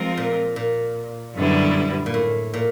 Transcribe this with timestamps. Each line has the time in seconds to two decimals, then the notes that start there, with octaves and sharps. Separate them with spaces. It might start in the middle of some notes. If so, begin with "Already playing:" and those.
Already playing: F3 G#3 C4 F4 A#4
0.17 A#2
0.56 A#2
1.35 F#2 D3 G3 B3 E4
2.06 A#2
2.14 A2
2.54 A#2